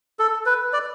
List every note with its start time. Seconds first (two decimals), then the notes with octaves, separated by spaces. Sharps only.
0.19 A4
0.46 B4
0.73 D5